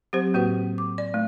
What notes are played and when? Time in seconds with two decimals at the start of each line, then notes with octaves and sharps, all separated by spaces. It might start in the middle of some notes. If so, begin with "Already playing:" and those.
0.13 F#3 C4 G4 C5
0.34 A2 A#3 F#4 B4
0.78 D6
0.98 D5
1.14 A3